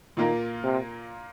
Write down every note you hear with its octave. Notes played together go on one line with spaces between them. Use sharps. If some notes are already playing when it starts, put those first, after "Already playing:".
A#2 D#3 A#3 F4 A#4
C3